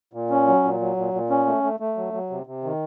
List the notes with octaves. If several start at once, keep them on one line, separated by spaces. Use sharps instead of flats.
A#2
C#4
F#3
A#2
F#3
A#2
A#2
C#4
A3
A3
A3
F#3
F#3
C3
C3
D#3